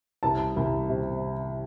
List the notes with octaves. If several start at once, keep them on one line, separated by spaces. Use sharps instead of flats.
C2 A5
C2
C3